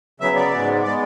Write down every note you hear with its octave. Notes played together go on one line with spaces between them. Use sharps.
C#3 F#3 B3 E5
D5
G#2 G#3 B3
G#3 B3 D5